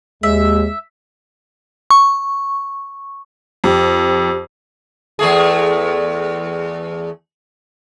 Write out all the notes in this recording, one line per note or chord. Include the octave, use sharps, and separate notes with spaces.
D#2 G#3 E5
C#6
F2 G4
E2 A3 G#4